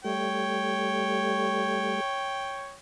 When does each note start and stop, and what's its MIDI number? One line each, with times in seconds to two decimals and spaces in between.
0.04 2.01 55
0.04 2.01 57
0.04 2.75 73
0.04 2.75 79